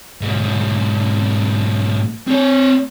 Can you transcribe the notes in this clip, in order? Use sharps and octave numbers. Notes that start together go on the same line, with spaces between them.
G#2 B2
C4 C#5